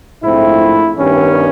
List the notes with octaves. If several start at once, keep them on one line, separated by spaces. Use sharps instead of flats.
A#1 G#2 F3 A3 C4 E4
G2 D#3 G3 B3 C#4